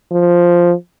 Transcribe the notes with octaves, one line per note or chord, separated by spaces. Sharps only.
F3